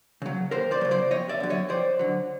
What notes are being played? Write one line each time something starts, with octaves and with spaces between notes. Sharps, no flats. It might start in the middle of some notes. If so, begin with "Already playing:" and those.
C#3 F#3
D#2 A#4 C5
C5 D5
C#3 F#3
C5 D5
F2 C#5 D#5
D5 E5
D3 F#3
C#5 D#5
F2 C5 D5
D3 F#3